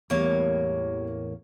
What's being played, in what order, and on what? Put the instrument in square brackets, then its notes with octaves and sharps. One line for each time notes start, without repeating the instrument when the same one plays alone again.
[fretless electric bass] A1 E2 A2 [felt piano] G3 B3 [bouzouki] A#3 C#5